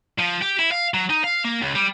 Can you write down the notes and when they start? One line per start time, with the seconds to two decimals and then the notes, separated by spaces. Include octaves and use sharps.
0.18 F3
0.42 G4
0.59 E4
0.71 F5
0.94 F#3
1.10 D#4
1.24 F5
1.44 A#3
1.62 C#2
1.75 G3